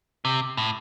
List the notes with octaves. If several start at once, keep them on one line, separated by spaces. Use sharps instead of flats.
C3
A2